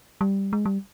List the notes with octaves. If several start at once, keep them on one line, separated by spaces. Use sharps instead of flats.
G3
G#3
G3